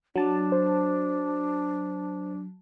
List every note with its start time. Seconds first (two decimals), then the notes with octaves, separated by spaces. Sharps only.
0.16 F#3 D4 A5
0.52 C5